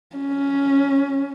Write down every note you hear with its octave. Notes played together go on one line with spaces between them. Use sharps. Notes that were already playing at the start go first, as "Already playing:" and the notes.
C#4